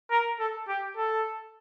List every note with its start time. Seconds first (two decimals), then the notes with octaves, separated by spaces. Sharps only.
0.10 A#4
0.39 A4
0.68 G4
0.97 A4